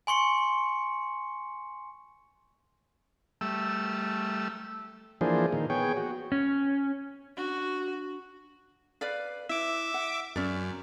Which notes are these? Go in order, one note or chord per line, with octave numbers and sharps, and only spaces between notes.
G#5 C6 C#6 C#7
G3 A3 E5 E6
E3 F3 A#3 D4 G#4 C5
A#2 D#3
B3 G#4 C#5 G5
F#4
C#4
D4 F#4
B4 D5 F5
E4 E5 D6
F#5
F#2 C#4 D5